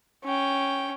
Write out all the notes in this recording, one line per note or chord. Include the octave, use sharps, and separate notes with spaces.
C#4 G5